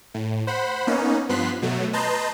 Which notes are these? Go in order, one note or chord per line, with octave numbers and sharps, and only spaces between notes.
A2
C5 F#5 B5
A#3 B3 C#4 D#4
G2 F3 B3 C6 F#6 B6
B2 F#3 A3
B4 D#5 A5 A#5 C6 G6